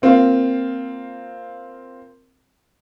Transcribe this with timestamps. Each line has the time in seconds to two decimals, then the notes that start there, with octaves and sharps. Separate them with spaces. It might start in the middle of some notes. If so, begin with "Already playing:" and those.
0.02 A#3 C4 F4